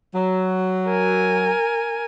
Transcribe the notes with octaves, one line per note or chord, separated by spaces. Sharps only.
F#3
A#4 G#5